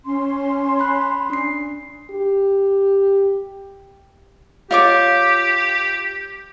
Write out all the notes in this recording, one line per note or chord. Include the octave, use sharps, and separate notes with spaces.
C#4 C6
B5 F#6
D4 C7
G4
F4 G4 C#5 D6